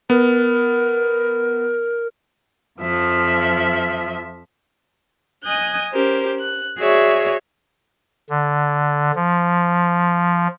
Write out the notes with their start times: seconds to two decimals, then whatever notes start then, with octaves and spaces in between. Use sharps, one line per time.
0.10 B3 A#4
2.79 F2 F3 E5
5.44 D#5 G#5 D#6 F#6 G6
5.93 C#4 G4 A#4 C5
6.40 F#6
6.79 F#4 G#4 C#5 D5 E5
8.30 D3
9.16 F3